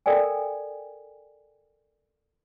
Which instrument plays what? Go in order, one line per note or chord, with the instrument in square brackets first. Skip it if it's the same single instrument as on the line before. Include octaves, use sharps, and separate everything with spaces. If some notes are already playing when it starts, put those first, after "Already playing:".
[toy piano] A4 A#4 D5 G5 G#5